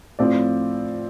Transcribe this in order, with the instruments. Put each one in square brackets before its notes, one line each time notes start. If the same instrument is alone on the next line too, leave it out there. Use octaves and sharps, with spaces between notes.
[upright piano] A2 F3 C4 D5